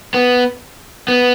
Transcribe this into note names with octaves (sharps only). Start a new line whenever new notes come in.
B3
B3